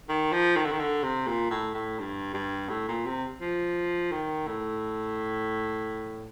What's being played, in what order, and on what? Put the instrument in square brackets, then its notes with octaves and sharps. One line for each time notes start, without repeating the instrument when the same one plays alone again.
[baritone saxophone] D#3
F3
D#3
D3
D#3
D3
C3
A#2
A2
A2
G2
G2
A2
A#2
C3
F3
D#3
A2